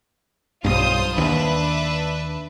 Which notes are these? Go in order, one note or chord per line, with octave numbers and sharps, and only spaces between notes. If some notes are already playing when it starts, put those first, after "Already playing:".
B1 G2 F4 C5 D#6
D#2 D4 B4 E5